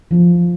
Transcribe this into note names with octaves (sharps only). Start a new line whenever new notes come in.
F3